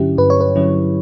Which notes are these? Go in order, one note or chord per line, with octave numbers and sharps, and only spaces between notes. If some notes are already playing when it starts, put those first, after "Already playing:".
Already playing: G2 D3 F#3 C#4 E4 G4
G2 B4
C#5
B4
D3 F#3 C#4 E4